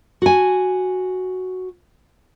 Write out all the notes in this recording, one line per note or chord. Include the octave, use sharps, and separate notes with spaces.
F#4 G#5